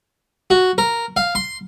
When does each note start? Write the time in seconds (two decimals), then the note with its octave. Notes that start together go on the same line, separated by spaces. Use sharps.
0.50 F#4
0.78 A#4
1.17 F5
1.35 C6